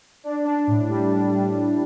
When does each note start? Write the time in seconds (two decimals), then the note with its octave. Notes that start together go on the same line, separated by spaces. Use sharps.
0.24 D4
0.45 D4
0.67 A2
0.89 G3
1.11 D4
1.32 G3